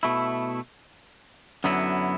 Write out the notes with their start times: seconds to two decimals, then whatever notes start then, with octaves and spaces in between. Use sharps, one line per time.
0.03 B2 A3 E4
1.64 F#2 D3 F#3 B3 E4